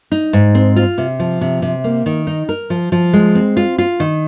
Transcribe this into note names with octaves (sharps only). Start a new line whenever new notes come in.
D#4
G#2
C4
F4
C3
F3
C3
C3
A#3
D#3
D#4
A#4
F3
F3
G#3
C4
F4
F4
D#3